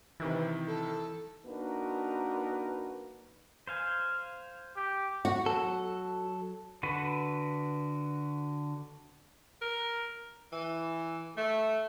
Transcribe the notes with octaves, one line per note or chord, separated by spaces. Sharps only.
C3 D#3 E3 E4
A4
A#3 D4 D#4 F#4 A#4 B4
C5 F5 G#5
G4
F#4
F#3 A4
D3 F#4 B4
A#4
E3
A3